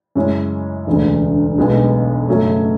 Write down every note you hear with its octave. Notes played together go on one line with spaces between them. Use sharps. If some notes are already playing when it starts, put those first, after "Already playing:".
F#2 C#3 G#3 C#4 E4
E1 D2 C#3
B1 B2 G#3
F#2 C#3 F#3 A3 C#4